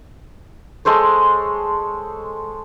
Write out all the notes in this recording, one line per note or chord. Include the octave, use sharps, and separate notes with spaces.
G#3 A4 C5 C#5